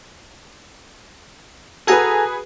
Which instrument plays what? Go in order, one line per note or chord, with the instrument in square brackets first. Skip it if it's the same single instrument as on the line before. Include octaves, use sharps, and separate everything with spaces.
[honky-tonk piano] F#4 G#4 B4 [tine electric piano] A4 G#5 A#5